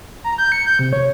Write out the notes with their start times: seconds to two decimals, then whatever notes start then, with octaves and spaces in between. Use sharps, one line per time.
0.24 A#5
0.38 G6
0.52 C#7
0.66 G6
0.79 C3
0.93 C#5